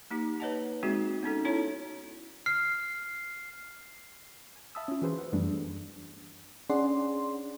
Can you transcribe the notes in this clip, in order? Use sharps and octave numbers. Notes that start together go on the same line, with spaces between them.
A#3 D#4 G4
B4 C#5 D#5 F#5 A5
G#3 C4 D#4 F#4 G#4
B3 C#4 D#4 A4
C#4 D#4 E4 C#5 E5 A5
F6 C7
G#5
E5 F5 A5 B5 D#6 E6
C#4 F4
E3 F#4 G#4 B4 C5
F#5
F#2 E3 G3 A3 B3 D4
C#4 D4 G#4 D5 F#5 C6